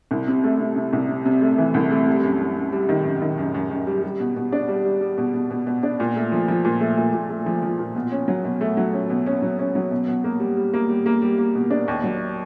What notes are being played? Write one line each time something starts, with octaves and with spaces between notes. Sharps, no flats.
C2
C3
A3
C3
C3
C2
C3
C3
A3
E3
C2
A3
G3
F#2
F#2
F#2
G3
D#3
F#2
D#3
F#2
F#2
F#2
G3
G3
B2
B2
D4
G3
G3
G3
B2
B2
B2
B2
D4
A#2
A3
F3
F3
A#2
A3
A#2
A#2
A3
F3
F3
A#2
B2
C#4
F#3
B2
A3
F#3
C#4
B2
C#4
F#3
C#4
F#3
B2
B2
A#3
G3
G3
A#3
G3
A#3
G3
A#3
B2
D4
D#2
F#3